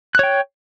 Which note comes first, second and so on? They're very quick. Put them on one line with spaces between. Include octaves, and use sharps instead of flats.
F#6 C#5 G5